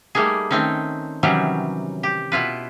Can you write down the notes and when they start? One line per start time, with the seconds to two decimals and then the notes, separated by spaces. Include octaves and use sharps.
0.15 G3 A3 A#3 D#4 G#4
0.51 D#3 A3 C4 C#4 D#4
1.23 C3 D#3 E3 F#3 G3 C#4
2.03 G4
2.32 B2 E4 F4 B4